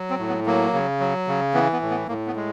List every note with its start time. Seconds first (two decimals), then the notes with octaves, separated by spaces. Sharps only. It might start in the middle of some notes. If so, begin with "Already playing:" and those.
Already playing: F#3
0.10 C4
0.19 A2
0.28 B3
0.46 F#3 A#3
0.73 C#3
1.00 F#3
1.27 C#3
1.54 E3 B3
1.73 B3
1.82 A2
1.90 B3
2.08 A2 A#3
2.27 B3
2.36 G#3